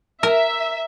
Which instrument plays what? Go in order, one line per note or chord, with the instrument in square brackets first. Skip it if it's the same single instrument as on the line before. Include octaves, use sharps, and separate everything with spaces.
[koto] A#4 [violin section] E5